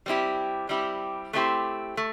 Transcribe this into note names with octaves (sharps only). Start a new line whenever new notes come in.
G3 C4 E4 G4
G3 C4 E4 G4
A3 C4 E4 G4 C5
A3